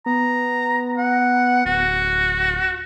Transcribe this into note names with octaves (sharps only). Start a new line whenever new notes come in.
B3 A#5
F#5
D1 F#4